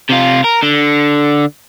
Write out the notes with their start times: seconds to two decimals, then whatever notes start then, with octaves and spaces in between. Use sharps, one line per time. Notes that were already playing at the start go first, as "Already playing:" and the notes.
0.09 C3 F4
0.44 A#4
0.63 D3